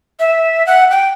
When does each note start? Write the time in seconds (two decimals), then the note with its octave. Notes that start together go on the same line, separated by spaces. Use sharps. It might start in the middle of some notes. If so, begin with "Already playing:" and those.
0.20 E5
0.67 F#5
0.91 G5